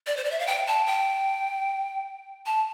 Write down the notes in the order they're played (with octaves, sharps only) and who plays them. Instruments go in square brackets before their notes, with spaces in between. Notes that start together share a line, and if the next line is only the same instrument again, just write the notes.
[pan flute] D5
C5
D5
E5
F5
G5
A5
G5
A5